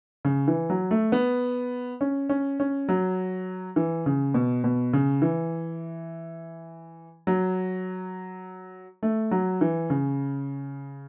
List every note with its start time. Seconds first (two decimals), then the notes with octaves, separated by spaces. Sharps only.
0.25 C#3
0.48 E3
0.70 F#3
0.91 A3
1.12 B3
2.01 C#4
2.29 C#4
2.60 C#4
2.89 F#3
3.76 E3
4.06 C#3
4.34 B2
4.64 B2
4.93 C#3
5.22 E3
7.27 F#3
9.03 A3
9.31 F#3
9.61 E3
9.90 C#3